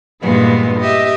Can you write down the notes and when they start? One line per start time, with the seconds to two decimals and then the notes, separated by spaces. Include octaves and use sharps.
0.22 G2 A#2 E3 G#3 B3
0.79 G4 D#5 E5